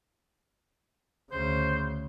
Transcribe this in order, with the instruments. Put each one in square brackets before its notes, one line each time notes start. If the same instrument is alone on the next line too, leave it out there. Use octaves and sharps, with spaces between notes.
[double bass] D2 C#3 [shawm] C5